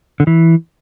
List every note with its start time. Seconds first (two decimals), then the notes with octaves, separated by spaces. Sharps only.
0.20 D3
0.27 E3